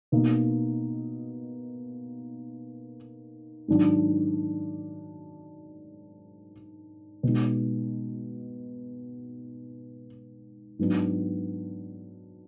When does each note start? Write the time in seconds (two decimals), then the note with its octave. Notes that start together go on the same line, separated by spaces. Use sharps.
0.12 B2 A#3 D#4
3.68 G#2 D#3 F#3 D4
7.23 B2 G#3 D#4
10.79 G#2 F#3 B3 D4